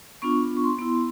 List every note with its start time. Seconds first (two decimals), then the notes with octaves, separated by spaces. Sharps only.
0.22 B3 D4 F4 C#6
0.57 C#6
0.64 C6
0.79 B3 E4